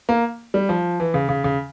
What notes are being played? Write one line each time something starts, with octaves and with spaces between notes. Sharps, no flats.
A#3
G3
F3
E3
C#3
C#3
C#3